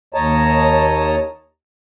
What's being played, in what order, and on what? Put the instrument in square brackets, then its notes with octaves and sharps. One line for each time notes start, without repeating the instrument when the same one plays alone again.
[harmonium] D#2 C#5 D#5 A5 A#5